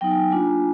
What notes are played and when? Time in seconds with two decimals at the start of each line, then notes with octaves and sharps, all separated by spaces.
0.01 F#3 B3 D#4 G5
0.11 G#5
0.31 A#3 D4 F4 G#5